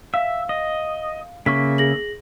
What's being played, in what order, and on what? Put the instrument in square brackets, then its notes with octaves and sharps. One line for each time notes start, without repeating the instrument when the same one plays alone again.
[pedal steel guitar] E5 [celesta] F5
[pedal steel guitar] D#5
[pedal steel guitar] C#3 A#3 E5 [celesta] C#6 B6
[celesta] G#4 A#6 F#7